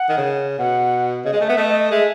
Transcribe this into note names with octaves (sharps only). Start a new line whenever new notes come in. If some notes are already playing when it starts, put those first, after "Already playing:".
Already playing: F#5
D#3
C#3
B2 F#5
C#3 D#5
G#3
D#5
A3
B3 E5
A3 D#5
D#5
D#5
G#3 E5